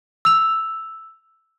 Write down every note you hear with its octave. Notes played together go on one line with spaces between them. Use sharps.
E6 F7